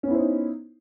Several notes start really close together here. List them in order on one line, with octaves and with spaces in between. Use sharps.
C#4 B3 E4 C5 D#4